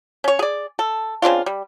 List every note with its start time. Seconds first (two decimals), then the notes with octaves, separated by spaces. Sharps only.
0.24 C#4 C#5
0.39 G#4 D5
0.79 A4
1.22 C#3 C4 D4 F4
1.46 G3